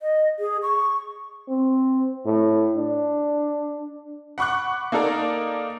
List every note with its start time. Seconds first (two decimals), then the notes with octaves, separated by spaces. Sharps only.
0.02 D#5
0.39 G#4
0.63 C#6
1.49 C4
2.26 A2
2.77 D4
4.38 F#5 B5 C#6 D6 F#6
4.92 A#3 D#4 A4 A#4 D5